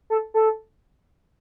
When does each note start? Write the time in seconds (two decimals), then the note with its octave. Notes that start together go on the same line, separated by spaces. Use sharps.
0.10 A4
0.34 A4